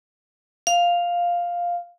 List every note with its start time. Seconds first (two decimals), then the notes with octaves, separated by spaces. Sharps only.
0.67 F5